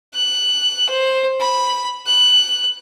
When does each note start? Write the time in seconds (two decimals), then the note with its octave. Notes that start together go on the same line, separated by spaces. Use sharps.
0.15 F#6
0.89 C5
1.40 B5
2.07 F#6